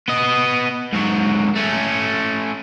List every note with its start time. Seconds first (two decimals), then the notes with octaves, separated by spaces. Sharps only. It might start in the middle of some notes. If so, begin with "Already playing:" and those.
0.08 B3 D#5
0.93 G#2 F#3
1.56 A3 C#4